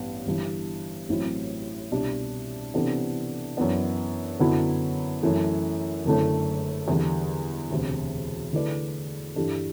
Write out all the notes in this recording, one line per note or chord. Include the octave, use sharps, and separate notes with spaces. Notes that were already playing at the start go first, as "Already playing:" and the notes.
Already playing: A1 G2 B3
G1 G2 E3
A1 A2 F#3 C4 E4
C2 B2 G3 D4
C3 E3 B3 D4 A4
F#2 E3 B3 D4
F#2 D3 F#3 B3 E4
F#2 E3 A3
F#1 F#2 D3 A3 E4
E2 D3 G3
E1 D2 C3
D3 A3 E4 B4 D5
G2 E3 G3 D4 A4